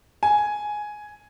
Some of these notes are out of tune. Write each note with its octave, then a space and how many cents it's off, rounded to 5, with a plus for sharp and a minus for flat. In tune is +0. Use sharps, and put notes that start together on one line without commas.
G#5 +5